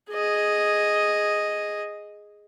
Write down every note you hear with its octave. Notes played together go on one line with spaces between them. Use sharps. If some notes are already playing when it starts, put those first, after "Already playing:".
G#4 D#5